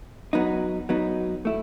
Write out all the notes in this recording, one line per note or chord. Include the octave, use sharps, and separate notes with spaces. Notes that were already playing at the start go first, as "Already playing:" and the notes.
F#3 B3 D#4
F#3 B3 D#4
A3 E4